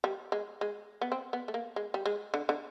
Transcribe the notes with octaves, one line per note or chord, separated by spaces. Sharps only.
G3
G#3
G#3
B3
C4
B3
A3
A#3
G#3
G3
G#3
D3
D3